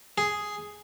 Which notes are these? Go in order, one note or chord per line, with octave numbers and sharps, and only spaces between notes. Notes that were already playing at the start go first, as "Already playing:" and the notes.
G#4